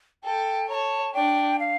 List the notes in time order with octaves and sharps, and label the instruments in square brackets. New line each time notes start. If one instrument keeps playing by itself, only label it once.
[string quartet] A4 [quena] G5
[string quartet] C#5 [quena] A#5
[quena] A5
[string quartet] D4 [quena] G5
[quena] F5